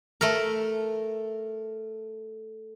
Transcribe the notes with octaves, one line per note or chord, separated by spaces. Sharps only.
A3 A#4